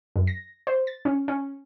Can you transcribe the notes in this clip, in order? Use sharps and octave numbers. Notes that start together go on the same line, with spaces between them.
F#2
A#6
C5
A6
C#4
C#4